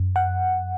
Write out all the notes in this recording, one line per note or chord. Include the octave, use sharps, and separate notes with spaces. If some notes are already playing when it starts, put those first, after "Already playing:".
Already playing: F#2
F#5